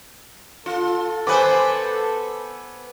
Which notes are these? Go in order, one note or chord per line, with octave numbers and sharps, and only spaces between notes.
F4 A4
B3 B4 C5 G#5 D6